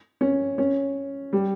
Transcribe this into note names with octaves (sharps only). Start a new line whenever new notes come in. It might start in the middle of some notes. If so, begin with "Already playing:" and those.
C#4
C#4
G3